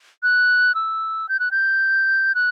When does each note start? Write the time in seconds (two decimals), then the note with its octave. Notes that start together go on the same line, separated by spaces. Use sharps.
0.23 F#6
0.75 E6
1.29 G6
1.40 F#6
1.51 G6
2.35 F#6